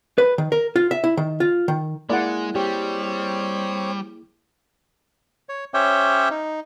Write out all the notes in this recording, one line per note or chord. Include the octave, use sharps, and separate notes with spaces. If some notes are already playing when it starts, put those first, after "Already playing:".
B4
D#3
A#4
F4
E5
E4
D#3
F4
D#3
G#3 A#3 E4 G#4 D5 F#5
G3 C4 G4 C#5
C#5
C#4 G4 C5 C#5 E5 G5
D#4